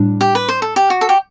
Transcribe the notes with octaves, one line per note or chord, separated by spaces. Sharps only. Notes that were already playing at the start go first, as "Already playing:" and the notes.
Already playing: A2 G3 D4
G4
B4
C5
A4
G4
F#4
A4
G4